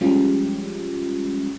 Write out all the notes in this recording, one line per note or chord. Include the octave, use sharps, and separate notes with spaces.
F3 G3 G#3 C#4 F4 G4